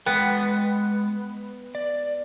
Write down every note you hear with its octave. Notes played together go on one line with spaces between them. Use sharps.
G#3 B3 G5
D5